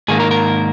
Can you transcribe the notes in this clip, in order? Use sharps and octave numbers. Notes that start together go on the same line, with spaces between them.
G#2 D#3 A#3 G#4
A#4
A#4